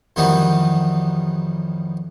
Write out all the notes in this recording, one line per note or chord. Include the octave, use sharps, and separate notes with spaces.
F2 D#3 E3 F#3 G3 B3